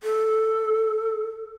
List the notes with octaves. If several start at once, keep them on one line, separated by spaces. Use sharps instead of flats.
A4